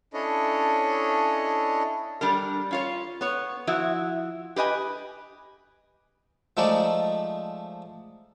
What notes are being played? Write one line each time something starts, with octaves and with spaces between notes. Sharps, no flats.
C#4 D4 E4 A4 C#5 D#5
G3 D4 A#4
C#4 F4 C#5
B3 C#5
F3 E4 F#4 E5
G4 B4 D#5 G#5
F3 G#3 A3 D#4 D5